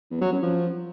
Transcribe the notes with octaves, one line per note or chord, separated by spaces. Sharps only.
E2
F#3
F#2
F3